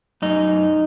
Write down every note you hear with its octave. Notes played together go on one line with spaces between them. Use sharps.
F#2 D#4